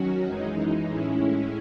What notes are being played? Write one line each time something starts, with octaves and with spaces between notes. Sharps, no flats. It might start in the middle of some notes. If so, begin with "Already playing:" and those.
Already playing: D#3 F#3 C#4 F#4
F#2 E3 G#3 D#4
A2 G#3 C#4 E4